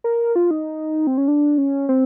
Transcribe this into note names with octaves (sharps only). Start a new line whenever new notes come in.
A#4
F4
D#4
C4
C#4
D4
C#4
C4